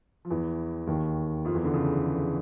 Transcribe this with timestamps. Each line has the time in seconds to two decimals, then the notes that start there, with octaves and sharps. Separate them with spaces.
0.25 F3
0.30 E2 E3
0.87 D#2 D#3
1.45 F2 F3
1.54 E2 E3
1.65 D3
1.74 C#3